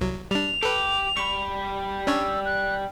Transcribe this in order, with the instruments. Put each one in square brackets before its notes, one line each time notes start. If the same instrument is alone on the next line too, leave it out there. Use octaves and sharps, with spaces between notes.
[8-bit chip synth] C2 F#3
[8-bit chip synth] G3 D4 [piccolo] F7
[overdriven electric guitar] G4 [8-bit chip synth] A4 B4
[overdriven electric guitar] G3 B5 [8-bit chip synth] C#6
[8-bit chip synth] C#4 D4 C#5 [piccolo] E6
[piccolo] F#6